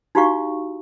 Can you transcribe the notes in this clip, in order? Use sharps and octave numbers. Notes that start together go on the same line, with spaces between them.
D#4 E4 F#4 G4 F5 C#6